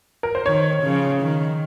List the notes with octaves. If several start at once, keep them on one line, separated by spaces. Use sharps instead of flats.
A#4
C5
D#3 C#5
C#3 F3
D#3